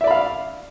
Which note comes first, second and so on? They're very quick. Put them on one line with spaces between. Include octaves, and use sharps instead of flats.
E5 D5 B5 F5